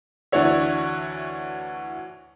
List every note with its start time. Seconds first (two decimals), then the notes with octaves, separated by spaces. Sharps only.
0.32 D2 E3 D4 F#4 C#5 E5